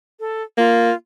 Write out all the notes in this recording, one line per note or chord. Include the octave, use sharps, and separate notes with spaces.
A4
A#3 F4